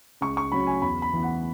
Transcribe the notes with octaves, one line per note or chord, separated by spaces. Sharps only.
C#2 C#6
C#6
C#3 F#3 C#4 B5
G#5
E2 B5
B5
E3 B3
F#5